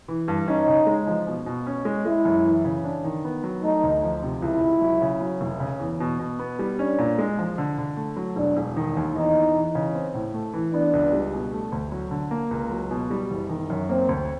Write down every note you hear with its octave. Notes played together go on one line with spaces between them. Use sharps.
E3
G2
C#4 D#4
C#3
G#3
F3
B2
B2
C#4
G#3
G#3 E4
F#2
E3
C#3
D4
D#3
B3
F#3
A3 D#4
D2
F3
C3
C#2 E4
C#2
F#3
C#3
F#3
F1
C#3
E2
B2
B2
B3
G3
C#4 D4
A#2
G#3
F3
D3
D3
A3
F#3
E1 D4
E1
D#3
D#2
E2 D#4
E2
E3
C#3
C4
A2
A3
E3
B3 D4
C#2
G3
B2
A3
D2
F#3
D3
A#3
C#2
F#3
B2
G3
F#1
D#3
F#2
A#3 C4
D2